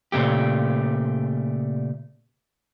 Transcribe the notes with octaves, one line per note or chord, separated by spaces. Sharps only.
A#2 C#3 A3 G4